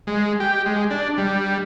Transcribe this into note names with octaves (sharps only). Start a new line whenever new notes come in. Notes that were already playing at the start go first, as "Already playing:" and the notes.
G#3
G4
G#3
D4
G3